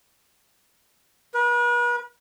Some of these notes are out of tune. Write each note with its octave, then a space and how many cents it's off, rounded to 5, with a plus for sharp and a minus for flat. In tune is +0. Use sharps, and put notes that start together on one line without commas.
B4 -40